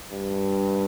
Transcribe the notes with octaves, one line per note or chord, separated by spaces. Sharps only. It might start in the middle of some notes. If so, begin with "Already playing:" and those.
G2